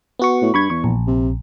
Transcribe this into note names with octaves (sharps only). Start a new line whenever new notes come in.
B3 F#4 C#6
A2
G2 B5 C#6 G#6
E2 C#6
A#1
C3